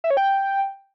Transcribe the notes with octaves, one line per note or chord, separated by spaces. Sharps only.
E5
C#5
G5